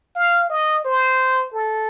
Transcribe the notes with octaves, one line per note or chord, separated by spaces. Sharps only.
F5
D#5
C5
A4